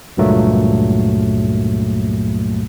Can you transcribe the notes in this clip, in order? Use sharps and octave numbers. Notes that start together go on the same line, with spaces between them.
C#2 G2 A#2 F#3 A3 A#3